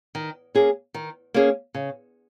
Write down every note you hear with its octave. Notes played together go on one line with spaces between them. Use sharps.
D#3
A#3 C#4 G#4
D#3
A#3 C#4 G#4
C#3